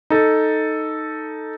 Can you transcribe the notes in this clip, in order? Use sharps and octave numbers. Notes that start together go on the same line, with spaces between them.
D#4 A4